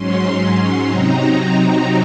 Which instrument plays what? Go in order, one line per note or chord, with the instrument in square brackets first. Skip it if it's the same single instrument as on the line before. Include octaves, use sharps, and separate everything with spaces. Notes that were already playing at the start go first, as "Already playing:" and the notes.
Already playing: [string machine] G#2 F#3 C#4 C6
C6
C3 F#3 C4 D#4 A#5